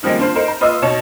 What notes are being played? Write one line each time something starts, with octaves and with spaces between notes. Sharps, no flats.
D#3 F3 G3 G#3 A#3
D4 F4 C5
D#4 A#4 C5
A#5
F4 B4 D#5 C6 D#6 E6
B2 D#4 C#5 A5 E7